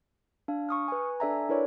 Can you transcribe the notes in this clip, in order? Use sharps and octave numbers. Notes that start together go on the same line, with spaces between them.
D4 F5
C#6 D#6 F6
B4 G#5
D4 A4 D5 E5 G#5 A#5
D4 E4 A#4 B4 C#5 D5